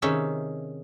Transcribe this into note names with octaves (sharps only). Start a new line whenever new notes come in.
C3 D#3 C#4 D#4 G#4 E5